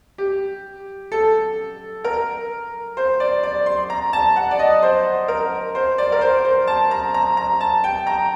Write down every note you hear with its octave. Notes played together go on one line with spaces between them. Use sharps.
G4
A4
A#4
C5
D5
D5
C6
A#5
A5
F#5
D5
D#5
C5
A#4
C5
D5
A#4
C5
C5
A5
A#5
A#5
A#5
A5
G5
A#5